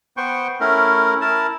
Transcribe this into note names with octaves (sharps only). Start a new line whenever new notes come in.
B3 C5 G5 C#6
A3 C#4 E4 A#4
E4 A#4 A5